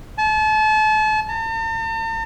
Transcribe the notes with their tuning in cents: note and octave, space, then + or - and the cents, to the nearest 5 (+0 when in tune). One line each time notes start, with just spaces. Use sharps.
A5 -35
A5 +45